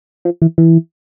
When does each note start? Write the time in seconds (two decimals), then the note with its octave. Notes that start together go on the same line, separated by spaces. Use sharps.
0.25 F3
0.42 E3
0.58 E3